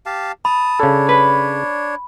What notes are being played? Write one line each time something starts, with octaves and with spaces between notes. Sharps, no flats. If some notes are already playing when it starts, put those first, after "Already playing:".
G4 F5 A5
A5 B5 D#6
C#3 D4 A4 C#5
B4